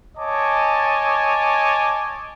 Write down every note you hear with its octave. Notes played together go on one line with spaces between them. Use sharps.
C#5 D#5 G#5 A5 D6